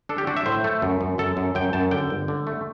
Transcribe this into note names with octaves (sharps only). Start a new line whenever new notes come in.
D4 A4
G4
D4 F#4
E5
A2 C5
A3
F#2
F#2
F#2 A4
F#2
F#2 G5
F#2 A5
D3 G5
G1
D3
A3